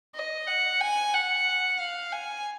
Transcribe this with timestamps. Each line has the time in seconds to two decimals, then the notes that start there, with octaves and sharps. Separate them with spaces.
0.15 D#5
0.47 F#5
0.80 G#5
1.13 F#5
1.79 F5
2.12 G#5